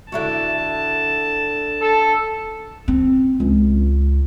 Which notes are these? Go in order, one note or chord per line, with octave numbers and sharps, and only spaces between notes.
D3 E4 F#4 A5
A4
C4
C#2